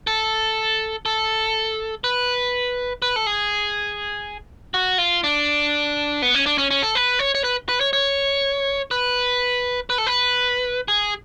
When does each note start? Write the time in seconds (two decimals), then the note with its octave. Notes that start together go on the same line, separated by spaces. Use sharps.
0.07 A4
1.06 A4
2.04 B4
3.02 B4
3.16 A4
3.27 G#4
4.74 F#4
4.98 F4
5.24 D4
6.22 B3
6.35 C#4
6.46 D4
6.58 C#4
6.71 C#4
6.83 A4
6.95 B4
7.19 C#5
7.35 C#5
7.44 B4
7.69 B4
7.81 C#5
7.93 C#5
8.91 B4
9.90 B4
9.98 A4
10.07 B4
10.88 G#4